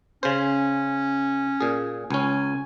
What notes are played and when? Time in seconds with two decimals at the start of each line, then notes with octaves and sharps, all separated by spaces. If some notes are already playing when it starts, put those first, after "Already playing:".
0.23 C#3 C#4 C5
1.61 A#2 G#4
2.10 C#2 C#4 G#5